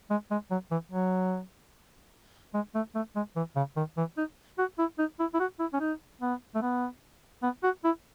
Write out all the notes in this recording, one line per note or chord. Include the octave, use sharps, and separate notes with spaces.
G#3
G#3
F#3
E3
F#3
G#3
A3
A3
G#3
E3
C#3
D#3
E3
D#4
F#4
E4
D#4
E4
E4
F#4
E4
C#4
D#4
B3
A3
B3
B3
F#4
E4